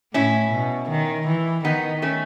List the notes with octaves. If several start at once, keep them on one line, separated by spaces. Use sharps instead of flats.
A2 C#4 E4
B2
D#3
E3
D#3 B3 D#4
A3 C#4